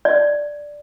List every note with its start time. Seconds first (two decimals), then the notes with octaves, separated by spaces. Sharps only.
0.05 D5